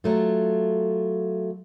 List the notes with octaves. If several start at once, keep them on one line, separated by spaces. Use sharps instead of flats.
F#3 A3 F4